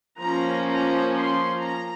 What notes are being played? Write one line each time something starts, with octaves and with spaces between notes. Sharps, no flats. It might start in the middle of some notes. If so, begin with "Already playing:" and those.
F3 A#3 C#4 A#5
A#5
C6
A#5